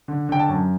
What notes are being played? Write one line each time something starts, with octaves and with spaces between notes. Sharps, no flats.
D3
D3 G5
A5
F#2